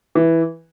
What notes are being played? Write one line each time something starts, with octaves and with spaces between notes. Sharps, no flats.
E3